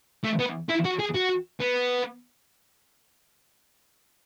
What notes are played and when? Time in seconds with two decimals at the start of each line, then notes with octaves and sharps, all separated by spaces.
0.24 A3
0.39 B3
0.69 E4
0.85 F#4
0.99 G#4
1.14 F#4
1.60 B3